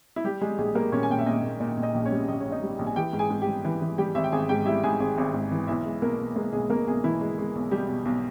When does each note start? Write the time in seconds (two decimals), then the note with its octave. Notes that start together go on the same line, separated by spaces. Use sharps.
0.16 E4
0.24 G3 G4
0.41 G3 G#3 G#4
0.58 A#1 G#3 G#4
0.75 G3 A#3 A#4
0.92 A#2 C#4 C#5
1.03 G#5
1.10 A#2 G5
1.18 E5
1.26 A#2 D#4 D#5
1.43 A#2
1.60 A#2 D#4 D#5
1.77 A#2
1.82 D#4 D#5
1.94 A#1
2.05 C#4 C#5
2.12 G3
2.28 A#1 D#5
2.40 C#5
2.46 A#1
2.52 D#4 D#5
2.63 G3
2.79 A#1
2.86 G#5
2.96 E3 G4 G5
3.13 G#2
3.19 G#4 G#5
3.30 G#2
3.42 G4 G5
3.47 G3
3.65 E3
3.82 E3
3.98 G3 G4 G5
4.15 G#1 E5
4.24 G5
4.32 G#1 G#4 G#5
4.49 G#2 G4 G5
4.66 G3 E4 E5
4.83 G#2 G#4 G#5
5.00 G#1 G#4 G#5
5.18 G#1
5.34 G#2
5.51 E3
5.67 B1 E4 E5
5.85 G#3
6.02 B2 A#3 A#4
6.19 B2
6.36 G#3 A#3 A#4
6.53 B1 G#3 G#4
6.70 B2 A#3 A#4
6.87 B1 G#3 G#4
7.03 B2 E3 E4
7.21 G#3
7.38 G#3
7.55 B1
7.71 B2 G3 G4
7.89 B2
8.05 B1